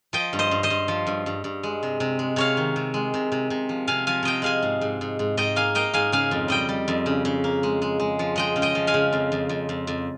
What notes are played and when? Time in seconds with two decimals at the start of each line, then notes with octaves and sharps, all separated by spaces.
0.13 F3 D#5 G5
0.33 G2
0.39 C5 D#5
0.51 G2
0.63 C5 D#5
0.70 G2
0.88 F3
1.07 G2
1.26 G2
1.44 G2
1.63 G#3
1.83 C3
2.00 C3
2.19 G#3
2.36 C3 C#5 F5
2.57 D#3
2.76 C3
2.94 G#3
3.14 C3
3.32 C3
3.50 C3
3.69 F3
3.87 C3 F5 G#5
4.07 F3 F5 G#5
4.23 C3 D#5 G5
4.42 G#3 F5 G#5
4.62 G#2
4.81 G#2
5.01 G#2
5.19 G#2
5.37 G#2 D#5 G5
5.56 A#3 F5 G#5
5.75 A#3 D#5 G5
5.94 G#2 F5 G#5
6.12 C#3 F5 G#5
6.31 F2
6.48 G3 D#5 G5
6.69 G3
6.88 F2
7.06 C#3
7.25 C#3
7.44 A#3
7.63 G#3
7.82 G#3
8.00 G#3
8.19 F3
8.36 G#3 D#5 G5
8.56 C#3
8.62 D#5 G5
8.75 F3
8.87 F5 G#5
8.94 C#3
9.13 F2
9.32 F2
9.49 F2
9.69 F2
9.87 F2